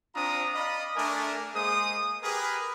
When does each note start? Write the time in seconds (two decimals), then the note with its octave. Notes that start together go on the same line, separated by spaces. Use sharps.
0.15 C4 D4 F4 A#5 D#6
0.53 D5 D#5 F5 B5 D#6
0.95 A3 D4 A#4 D5 G#5
1.53 G#3 A#3 G#4 C5 D#6
2.22 G4 G#4 A#4 B4